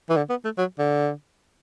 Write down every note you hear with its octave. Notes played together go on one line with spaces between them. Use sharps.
E3
D3
B3
A3
F#3
D3